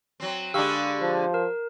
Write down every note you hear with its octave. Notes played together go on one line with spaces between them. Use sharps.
F#3 C4
D3 G#3 D4 G4 F5 B5 C#6 E6
F3
A#4